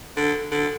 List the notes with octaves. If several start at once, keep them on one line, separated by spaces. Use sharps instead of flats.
D3
D3